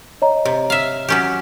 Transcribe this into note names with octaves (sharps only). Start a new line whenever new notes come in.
C#5 D#5 A#5
C3
E5 F5
F#3 C#4 G4